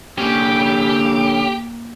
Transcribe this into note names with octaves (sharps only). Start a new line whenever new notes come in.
D3 A#3 C#4 G4